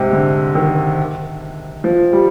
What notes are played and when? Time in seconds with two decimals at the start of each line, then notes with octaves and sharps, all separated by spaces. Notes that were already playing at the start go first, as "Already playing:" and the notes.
Already playing: G#2 C3
0.13 D3
0.55 D#3
1.84 F3
2.13 G3